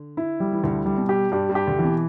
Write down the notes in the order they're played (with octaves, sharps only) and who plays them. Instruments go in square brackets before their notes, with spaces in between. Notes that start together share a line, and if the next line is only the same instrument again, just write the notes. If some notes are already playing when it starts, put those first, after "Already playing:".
Already playing: [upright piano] D3
[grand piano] E4
G3
[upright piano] E3
[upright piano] D2 D3 [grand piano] E4
[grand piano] G3
[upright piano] B2
[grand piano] G4
[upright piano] G2 G3 [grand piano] G4
[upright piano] G2 G3
[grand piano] G4
[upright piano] D2 D3
[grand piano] E3
[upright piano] B2